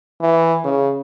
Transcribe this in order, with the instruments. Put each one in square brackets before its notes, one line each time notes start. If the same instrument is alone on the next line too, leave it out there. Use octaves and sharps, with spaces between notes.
[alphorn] E3
C#3